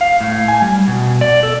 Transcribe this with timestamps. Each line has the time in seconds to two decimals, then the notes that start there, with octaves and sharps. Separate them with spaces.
0.01 F5
0.21 A2
0.48 G#5
0.62 G3
0.88 B2
1.21 D5
1.43 A4